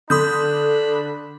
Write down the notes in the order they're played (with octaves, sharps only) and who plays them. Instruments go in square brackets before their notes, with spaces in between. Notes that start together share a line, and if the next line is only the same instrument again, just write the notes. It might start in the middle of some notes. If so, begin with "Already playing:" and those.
[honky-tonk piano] D3 [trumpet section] D4 B5 [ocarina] A4 [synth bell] C6 D#6 G6